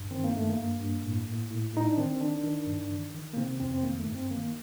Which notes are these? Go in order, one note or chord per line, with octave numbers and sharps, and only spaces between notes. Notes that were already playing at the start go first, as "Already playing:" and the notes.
Already playing: G2
D#3 C4
A#3
G2 A3
A#3
G2
G2
A2
A2
A2
A2 D#4
D4
D#3 C4
C4
D#3 D4
D#3
G2
D#3
D#3
A#3
C3 C4
F2 C4
C4
D#3 A#3
A3
G2
C4
D#3 A#3